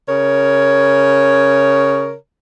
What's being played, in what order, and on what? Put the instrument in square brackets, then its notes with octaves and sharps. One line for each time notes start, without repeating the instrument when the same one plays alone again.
[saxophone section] C#3 A#4 C#5